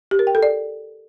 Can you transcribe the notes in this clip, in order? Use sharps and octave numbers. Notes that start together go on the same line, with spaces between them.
G4
A#4
G5
A4
D5